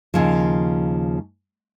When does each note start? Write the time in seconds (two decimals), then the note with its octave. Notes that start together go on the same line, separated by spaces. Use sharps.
0.14 D#2 C#3 F3